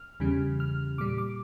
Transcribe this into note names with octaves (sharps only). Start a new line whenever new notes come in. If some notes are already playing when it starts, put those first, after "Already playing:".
Already playing: F6
E2 C#3 E3 G3
F6
A#2 G3 D6
D6